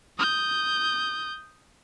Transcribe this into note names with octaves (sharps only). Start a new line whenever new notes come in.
D#6 G6